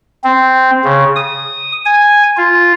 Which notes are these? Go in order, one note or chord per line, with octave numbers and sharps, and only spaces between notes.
C4
C#3
D#6
G#5
F4